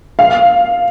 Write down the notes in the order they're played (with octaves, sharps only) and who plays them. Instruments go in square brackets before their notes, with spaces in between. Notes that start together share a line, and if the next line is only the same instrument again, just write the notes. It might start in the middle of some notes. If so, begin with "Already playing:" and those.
[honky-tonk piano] F5